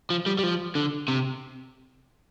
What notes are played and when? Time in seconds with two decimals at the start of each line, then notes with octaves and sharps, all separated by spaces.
0.10 F3
0.26 G3
0.39 G3
0.43 F3
0.75 D3
1.08 C3